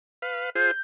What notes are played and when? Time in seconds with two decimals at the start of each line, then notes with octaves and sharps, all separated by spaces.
0.22 B4 F5
0.55 F4 G#4 C5 G6